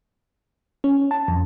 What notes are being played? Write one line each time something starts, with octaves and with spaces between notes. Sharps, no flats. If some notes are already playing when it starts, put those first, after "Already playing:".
C#4
A5
F2